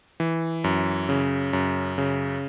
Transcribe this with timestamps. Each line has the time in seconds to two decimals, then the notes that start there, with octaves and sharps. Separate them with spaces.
0.20 E3
0.64 F#2
1.09 C#3
1.53 F#2
1.98 C#3